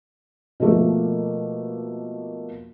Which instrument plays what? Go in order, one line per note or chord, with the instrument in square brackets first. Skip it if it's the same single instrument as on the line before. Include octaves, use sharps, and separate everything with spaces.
[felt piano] B2 F3 A3 A#3